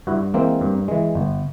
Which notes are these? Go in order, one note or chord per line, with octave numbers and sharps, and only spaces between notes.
G2 E4 F#4
E3 G#3 A#3 C4
G2
E3 G#3
G1